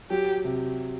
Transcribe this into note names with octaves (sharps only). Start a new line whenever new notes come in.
F#3 G4
C3